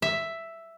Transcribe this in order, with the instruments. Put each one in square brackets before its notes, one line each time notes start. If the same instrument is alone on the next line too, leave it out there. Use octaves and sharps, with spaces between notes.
[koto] E5